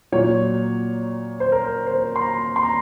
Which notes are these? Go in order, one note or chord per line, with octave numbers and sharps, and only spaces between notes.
A#2 F#3 C#5
C5
A#4
C5
C6
A#5
C6
A#5